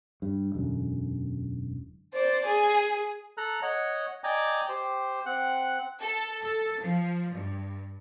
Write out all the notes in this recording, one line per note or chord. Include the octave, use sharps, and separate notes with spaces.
G2
E1 F#2 D3
C5 D5
G#4
A4 A#5 F#6
C#5 D#5 F#5
D5 D#5 G5 G#5 A#5 D6
G4 C5
C4 F#5 F#6
A4
A4
F3
G2